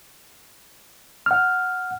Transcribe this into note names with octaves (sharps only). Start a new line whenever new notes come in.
F#5 F6